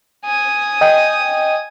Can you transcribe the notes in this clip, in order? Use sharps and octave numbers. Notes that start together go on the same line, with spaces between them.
G#5 D#6
D#5 G5